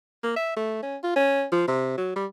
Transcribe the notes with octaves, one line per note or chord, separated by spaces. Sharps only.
A#3
E5
A3
C#4
F4
C#4
F3
C3
F#3
G3